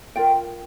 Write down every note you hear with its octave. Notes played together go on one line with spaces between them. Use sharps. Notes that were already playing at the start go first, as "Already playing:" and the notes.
F4 A#4 G5